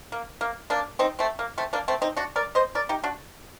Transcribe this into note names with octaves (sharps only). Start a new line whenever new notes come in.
A#3
A#3
A#3 D4
C4 D#4
A3 C4
A#3
A3 C4
A#3 D4
A3 C4
C4 D#4
D4 F#4
A#4 D5
C5 D#5
A#4 D5
D#4 G4
D4 F#4